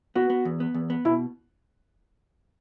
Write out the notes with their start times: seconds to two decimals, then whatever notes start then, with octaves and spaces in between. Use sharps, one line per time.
0.15 B3 F#4
0.30 B3
0.45 E2
0.60 B3
0.74 E2
0.90 B3
1.05 B2 E4